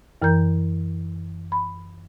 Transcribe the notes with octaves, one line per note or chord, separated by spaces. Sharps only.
F#2 E3 A#4 A#5 G6
B5